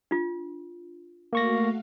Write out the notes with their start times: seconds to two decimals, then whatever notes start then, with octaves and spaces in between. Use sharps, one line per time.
0.11 D4 F4
1.33 A3 A#3 F#4 F5 C#6 A#6